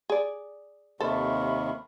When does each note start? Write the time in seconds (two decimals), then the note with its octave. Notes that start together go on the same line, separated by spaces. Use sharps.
0.10 G#4 D5
1.00 D#2 C3 D#3 A4 C5 E5 B5 C#6